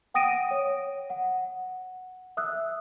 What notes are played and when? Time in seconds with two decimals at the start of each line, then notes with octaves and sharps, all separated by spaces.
0.14 F#5 G5 D#6 A#6 D7 D#7
0.51 C#5
1.10 F#5
2.37 E5 D#6 E6 F#6